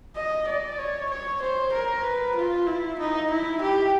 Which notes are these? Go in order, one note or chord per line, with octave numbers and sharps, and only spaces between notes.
D#5
D5
C#5
C#5
C5
A#4
B4
F4
E4
D#4
E4
G4